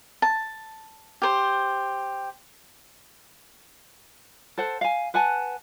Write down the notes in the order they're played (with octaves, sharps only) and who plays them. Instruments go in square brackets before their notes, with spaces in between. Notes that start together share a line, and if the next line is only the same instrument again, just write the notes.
[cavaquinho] A5
G4 C5
[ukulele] A4 C5 F#5
F5 G#5
B4 F#5 G#5 A5